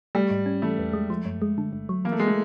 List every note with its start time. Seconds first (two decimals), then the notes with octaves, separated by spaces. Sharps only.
0.15 G3 A3
0.31 G#2
0.46 C#4
0.62 E3 A3
0.79 E2
0.93 G#3
1.10 F3
1.25 F#2
1.42 G#3
1.58 D3
1.73 G1
1.89 F#3
2.05 E3 A#3
2.12 A3
2.19 G#3
2.27 A3